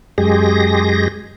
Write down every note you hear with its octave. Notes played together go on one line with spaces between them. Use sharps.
F#2 G#3 G4 G#4 A#6